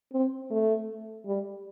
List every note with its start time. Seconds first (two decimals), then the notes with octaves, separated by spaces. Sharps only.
0.13 C4
0.51 A3
1.26 G3